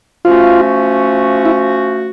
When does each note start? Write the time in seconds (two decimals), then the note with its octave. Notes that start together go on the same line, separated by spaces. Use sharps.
0.25 F3 A3 C#4 F4 F#4
1.45 E4